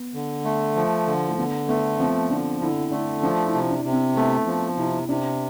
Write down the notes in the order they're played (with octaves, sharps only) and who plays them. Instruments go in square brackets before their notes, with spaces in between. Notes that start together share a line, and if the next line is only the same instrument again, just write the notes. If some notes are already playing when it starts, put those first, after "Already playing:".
Already playing: [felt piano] B3
[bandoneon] D3
A3
F3
D3
[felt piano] A3
[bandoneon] D3 [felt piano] B3
[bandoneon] A3 [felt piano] B3
[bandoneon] F3 [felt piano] C4
[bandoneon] D3 [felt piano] D4
[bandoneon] D3 [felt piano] E4
[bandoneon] A3 [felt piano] D4
[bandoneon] F3 [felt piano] D4
[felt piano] E4
[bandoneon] C3
[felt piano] D4
[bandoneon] C3
[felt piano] C4
[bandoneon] A3 [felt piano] B3
[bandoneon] F3
[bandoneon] C3 [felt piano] E4
[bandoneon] C3 [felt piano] D4